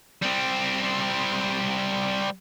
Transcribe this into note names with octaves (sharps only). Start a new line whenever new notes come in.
G3 C4